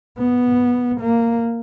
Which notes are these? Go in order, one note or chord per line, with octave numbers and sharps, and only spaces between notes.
B3
A#3